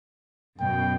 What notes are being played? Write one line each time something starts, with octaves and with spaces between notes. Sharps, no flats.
F#2 B2 G5